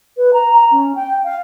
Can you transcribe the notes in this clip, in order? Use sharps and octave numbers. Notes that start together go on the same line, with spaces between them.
B4
A#5
A#5
C#4
G5
F5